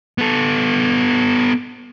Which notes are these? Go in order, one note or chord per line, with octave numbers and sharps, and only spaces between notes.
B3 A4